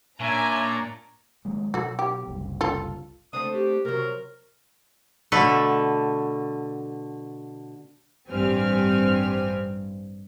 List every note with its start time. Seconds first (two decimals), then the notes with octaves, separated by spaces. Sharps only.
0.20 A#2 C#4 D4 C#5 D5 E5 G#5 A#5
1.45 D#3 F#3 G#3
1.74 B2 F#3 F#4 A4
1.99 G4
2.28 F#1 C2
2.61 F4 A4
3.33 A3 C4 D4 D#6
3.54 G4
3.85 C3 F#3 A#4
5.32 B2 D3 A3 A4 B4
8.28 A1 G2 C4 G4 G#5 F6